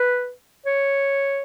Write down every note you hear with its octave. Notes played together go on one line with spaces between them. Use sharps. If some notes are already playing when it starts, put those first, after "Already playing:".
Already playing: B4
C#5